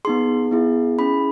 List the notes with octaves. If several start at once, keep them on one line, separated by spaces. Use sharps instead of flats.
B3 D#4 G#4 C6
B3 E4 G#4
C#4 E4 G#4 B5